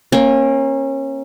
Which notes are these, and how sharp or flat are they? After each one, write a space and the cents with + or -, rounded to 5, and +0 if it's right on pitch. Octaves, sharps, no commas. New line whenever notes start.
A#3 +10 C#4 -30